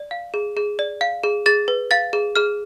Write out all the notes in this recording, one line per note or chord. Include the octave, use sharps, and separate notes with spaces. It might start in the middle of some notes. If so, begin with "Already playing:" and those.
Already playing: D5
F5
G#4
G#4
D5
F5
G#4
G#4 A6
B4
F5 A6
G#4
G#4 F6